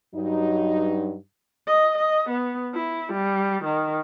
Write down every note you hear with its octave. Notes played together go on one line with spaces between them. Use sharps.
G2 F#3 D#4
D#5
D#5
B3
E4
G3
D#3